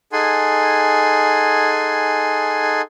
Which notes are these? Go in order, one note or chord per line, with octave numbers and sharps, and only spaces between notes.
D#4 G#4 A4 F#5 G#5 C6